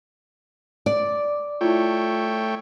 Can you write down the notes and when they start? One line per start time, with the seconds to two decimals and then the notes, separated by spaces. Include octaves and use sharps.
0.86 D5
1.61 A3 E4 F4 C#5 G5